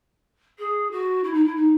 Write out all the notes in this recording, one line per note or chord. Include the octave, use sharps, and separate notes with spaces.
G#4
F#4
E4
D#4
E4
D#4